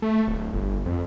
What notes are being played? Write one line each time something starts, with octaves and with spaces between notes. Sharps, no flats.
A3
D1
G1
F2